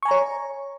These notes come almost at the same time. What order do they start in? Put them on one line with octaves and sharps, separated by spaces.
C#6 G#5 A#5 C#5